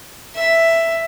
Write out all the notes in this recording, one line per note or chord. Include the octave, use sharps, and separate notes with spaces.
E5